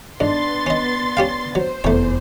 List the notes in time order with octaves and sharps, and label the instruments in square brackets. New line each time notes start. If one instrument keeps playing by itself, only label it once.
[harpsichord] G#2 [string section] B3 C6 A6 [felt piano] D4
[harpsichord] C#4 D#5
C#4 G4 F5
[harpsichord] F#3 [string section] C5
[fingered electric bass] F1 [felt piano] E2 [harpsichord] A3 C#5